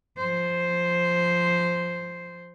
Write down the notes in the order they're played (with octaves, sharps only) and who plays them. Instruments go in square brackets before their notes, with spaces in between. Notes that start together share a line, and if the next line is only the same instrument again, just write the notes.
[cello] F3 C5